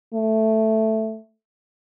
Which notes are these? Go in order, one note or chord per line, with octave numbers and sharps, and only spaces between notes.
A3